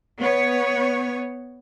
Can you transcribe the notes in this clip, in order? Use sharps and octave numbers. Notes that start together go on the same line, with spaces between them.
B3 C#5